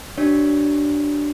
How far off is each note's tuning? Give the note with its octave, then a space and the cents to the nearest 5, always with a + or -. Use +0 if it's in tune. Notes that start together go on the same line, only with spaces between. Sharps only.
D4 +0 G4 -45 C#5 +0